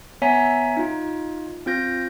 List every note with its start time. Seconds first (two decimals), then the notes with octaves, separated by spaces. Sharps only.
0.22 B3 C#5 E5 G#5 A#5 B6
0.77 D#4 F4
1.66 C4 F4 G6 A#6